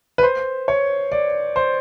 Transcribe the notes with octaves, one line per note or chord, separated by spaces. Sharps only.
B4
C5
C#5
D5
C5